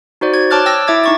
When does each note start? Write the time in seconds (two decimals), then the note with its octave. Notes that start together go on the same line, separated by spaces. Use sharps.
0.21 D#4 F#4 C5 D5
0.34 G#6
0.50 C#5 A5 D6 F6 F#6 A6
0.66 G5 E6 A#6
0.87 E4 E5 D6 G#6 A6
1.04 D#4 C#6 A6